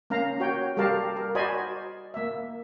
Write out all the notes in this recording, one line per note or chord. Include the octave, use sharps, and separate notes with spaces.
A#3 C#4 F5 A#5
F#4 C#5 G5
G3 G4 A4 A#4 F5 A5
A#4
F#4 C5 D5 D#5 G#5 B5
A#3 E5